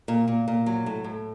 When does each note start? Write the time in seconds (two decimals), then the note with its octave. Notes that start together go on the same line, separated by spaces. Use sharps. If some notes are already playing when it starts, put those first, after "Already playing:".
0.08 A#2
0.28 A#2
0.48 A#2
0.66 F#3
0.86 A2
1.04 A2